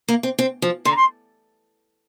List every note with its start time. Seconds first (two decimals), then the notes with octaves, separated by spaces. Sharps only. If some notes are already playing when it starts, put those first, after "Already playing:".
0.09 A#3
0.23 C4
0.39 C4
0.62 F3
0.85 D3 C6
0.91 A#5
0.96 C6